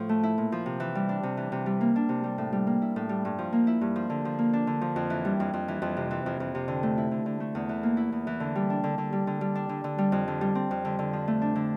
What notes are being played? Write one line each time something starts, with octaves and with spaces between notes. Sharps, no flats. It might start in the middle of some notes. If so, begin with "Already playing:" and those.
Already playing: A2 F3
A3
E4
A#2
F3
C3
E3
G3
D4
C3
E3
C3
G3
A#3
D4
C3
G3
A2
G3
A#3
E4
A2
G3
G2
F3
A#3
E4
G2
F3
D3
F3
A#3
D4
D3
F3
F2
E3
G3
F2
F2
E3
F2
C3
E3
F2
F2
C3
D3
A3
E4
D3
D3
A3
E2
E3
A#3
E4
E2
E3
D3
G3
D4
D3
D3
G3
D3
G3
D4
D3
D3
G3
F2
D3
G3
C4
F2
D3
D3
F3
A3
D4
D3